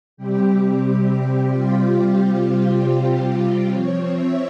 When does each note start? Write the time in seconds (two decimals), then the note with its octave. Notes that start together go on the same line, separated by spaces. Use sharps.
0.17 C3 G3 C4 G4
1.05 G4
1.49 F4
3.71 F3 C4 C#5
4.15 E5